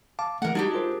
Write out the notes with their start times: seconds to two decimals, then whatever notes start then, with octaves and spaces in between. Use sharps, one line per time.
0.19 F5 A5 D6
0.42 E3 A3 A#4 F#5
0.55 G3 G#3 D4 D#4 F#4 G4
0.74 F4 A#4 C5